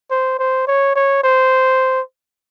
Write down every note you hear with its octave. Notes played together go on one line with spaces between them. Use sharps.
C5
C5
C#5
C#5
C5